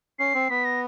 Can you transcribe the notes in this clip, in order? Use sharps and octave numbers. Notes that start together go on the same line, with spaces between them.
C#4 C7
C4
B3 B6
A#6